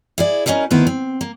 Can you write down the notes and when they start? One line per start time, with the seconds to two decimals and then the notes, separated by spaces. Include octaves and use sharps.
0.18 E4 G#4 D5
0.46 C#4 D#4 G#4 A#4 B4
0.70 D2 D#3 B3 E4 B4 C5
0.87 C4
1.21 A#3